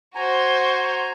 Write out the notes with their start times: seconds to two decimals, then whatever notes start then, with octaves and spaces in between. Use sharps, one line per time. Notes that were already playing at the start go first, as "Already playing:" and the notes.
0.15 F#4 C5 G#5 A#5